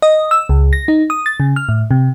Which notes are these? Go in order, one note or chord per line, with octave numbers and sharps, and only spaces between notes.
D#5
E6
C#2
A#6
D#4
D#6
A6
C#3
F6
A2
C3